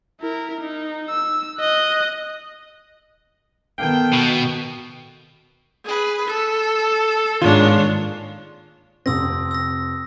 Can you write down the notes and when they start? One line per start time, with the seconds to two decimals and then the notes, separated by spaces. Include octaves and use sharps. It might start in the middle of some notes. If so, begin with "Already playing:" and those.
0.21 E4 A#4
0.61 D#4
1.10 E6
1.59 D#5 F#6
3.79 D#3 B3 A4 F5 G5
4.14 B2
5.85 G#4 B4
6.27 A4
7.42 G#2 D#3 G#3 A#3 D4 F4 C#5
9.06 F1 C4 D#6 E6 A#6
9.51 E6 A#6